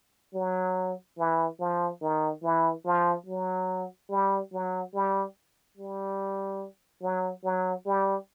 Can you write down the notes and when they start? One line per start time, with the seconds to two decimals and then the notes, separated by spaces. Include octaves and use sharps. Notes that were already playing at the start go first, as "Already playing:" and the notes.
0.34 F#3
1.18 E3
1.59 F3
2.01 D#3
2.43 E3
2.85 F3
3.26 F#3
4.10 G3
4.53 F#3
4.94 G3
5.78 G3
7.02 F#3
7.44 F#3
7.86 G3